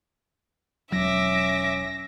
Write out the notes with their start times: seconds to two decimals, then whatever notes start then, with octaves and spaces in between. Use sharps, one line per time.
0.92 E1 F#3 C#4 E5 D6 A#6